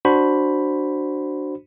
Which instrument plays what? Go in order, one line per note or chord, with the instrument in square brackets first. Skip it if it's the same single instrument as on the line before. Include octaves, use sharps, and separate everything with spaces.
[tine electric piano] D4 F#4 C5 B5